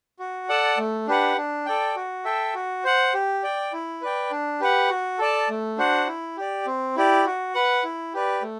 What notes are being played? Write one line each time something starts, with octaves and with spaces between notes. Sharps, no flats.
F#4
A4 D5 F#5 A5
A3
D4 G4 B4 F#5
D4
A4 D5 G5
F#4
A4 E5 G5
F#4
C5 F#5
G4
D5 G5
E4
B4 D5 G5
D4
G4 B4 F#5
F#4
A4 D5 A5
A3
D4 F#4 C5 F#5
E4
G4 D5
C4
E4 G4 D5
F#4
B4 F#5
E4
G4 B4 D5
A3